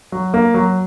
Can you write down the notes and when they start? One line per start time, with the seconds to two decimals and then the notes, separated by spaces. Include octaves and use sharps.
0.12 F#3
0.34 A#3
0.54 F#3